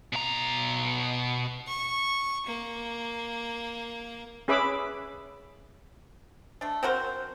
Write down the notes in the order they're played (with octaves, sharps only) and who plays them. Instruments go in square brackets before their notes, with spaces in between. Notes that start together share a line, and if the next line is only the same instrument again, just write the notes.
[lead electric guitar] B2 A#5
[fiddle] C#6
A#3
[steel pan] C#4 G#4 B4 E5 B5 D6
[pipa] A3 D4
C4 F#4 A#4 C5